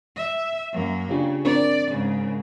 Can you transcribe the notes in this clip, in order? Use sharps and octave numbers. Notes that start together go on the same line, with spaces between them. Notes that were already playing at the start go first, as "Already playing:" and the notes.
E5
F#2 A#3
C#3 D4 F4 G4
C4 D4 A#4 D5
G#2 C#3